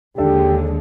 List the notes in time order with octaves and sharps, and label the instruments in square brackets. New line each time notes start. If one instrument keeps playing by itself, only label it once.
[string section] D#2 D3 G#3 [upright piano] D4 A4 D5 [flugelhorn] G4